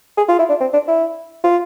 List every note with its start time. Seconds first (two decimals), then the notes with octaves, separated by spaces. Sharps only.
0.18 G#4
0.29 F4
0.39 E4
0.49 D4
0.61 C4
0.73 D4
0.88 E4
1.44 F4